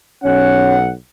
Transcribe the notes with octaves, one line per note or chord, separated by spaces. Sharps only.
B1 C#4 F#5